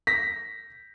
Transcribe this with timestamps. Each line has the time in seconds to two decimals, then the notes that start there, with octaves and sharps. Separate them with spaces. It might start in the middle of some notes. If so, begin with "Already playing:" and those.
0.07 A#6 B6